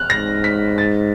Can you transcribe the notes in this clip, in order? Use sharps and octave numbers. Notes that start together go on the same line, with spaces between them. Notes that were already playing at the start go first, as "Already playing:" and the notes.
Already playing: F6 F#6
G#2 A#6
B6
A6